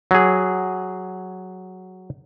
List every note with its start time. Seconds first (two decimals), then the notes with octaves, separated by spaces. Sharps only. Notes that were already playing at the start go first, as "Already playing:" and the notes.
0.11 F#3 G#4